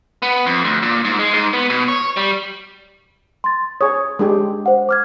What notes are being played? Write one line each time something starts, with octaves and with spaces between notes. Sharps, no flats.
B3
F2
D2
A#2
G#2
G#3
G#2
B3
B2
C#5
G3
C6 A6
G#4 C#5 D#6
G#3 D4 G4
C5 F#5
D6 F6 G#6